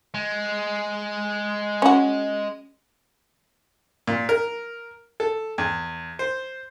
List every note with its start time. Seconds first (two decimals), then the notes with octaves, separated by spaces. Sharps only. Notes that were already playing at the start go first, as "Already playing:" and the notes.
0.14 G#3
1.82 C#4 F#4
4.07 A#2
4.29 A#4
5.20 A4
5.58 E2
6.19 C5